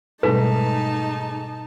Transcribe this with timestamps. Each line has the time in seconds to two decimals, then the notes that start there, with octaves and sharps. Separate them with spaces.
0.23 G#2 B2 G3 A3 D#4 B4 A5 B6